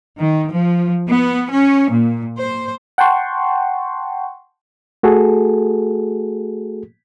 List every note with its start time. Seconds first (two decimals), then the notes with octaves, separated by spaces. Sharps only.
0.21 D#3
0.53 F3
1.09 B3
1.51 C#4
1.91 A#2
2.39 C5
2.98 F#5 G5 A5 C6 C#6
5.03 A3 F#4 G#4 A4